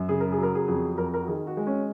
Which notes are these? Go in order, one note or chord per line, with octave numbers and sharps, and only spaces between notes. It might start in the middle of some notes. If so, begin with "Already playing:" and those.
Already playing: F#2
C#3 G#4
A#4
G#4
F#3 A#4
G#4
F2 G#4
F2 A#4
A#4
F#4
D#3 G#4
F#4
G#3
C#4